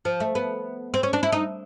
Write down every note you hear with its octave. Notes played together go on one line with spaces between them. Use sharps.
F3
A3
B3
C4
C#4
D4
E4
D#4